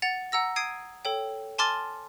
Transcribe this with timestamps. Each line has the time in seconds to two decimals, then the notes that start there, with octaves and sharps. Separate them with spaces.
0.02 F#5 A6 F7
0.32 F#5 A#5 E6 A#6
0.56 D#6 G#6 C7 D7 D#7
1.05 A4 C#5 G5
1.58 G#5 A5 C6 D6 F6 A6